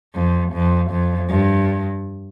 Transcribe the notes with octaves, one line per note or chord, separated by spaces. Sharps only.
F2
F2
F2
G2